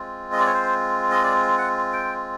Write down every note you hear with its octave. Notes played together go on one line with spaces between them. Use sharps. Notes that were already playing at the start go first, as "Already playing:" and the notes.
Already playing: G#3 C4 F4
D#5
D5
C#5
C5
D#5
D5
F#5
G5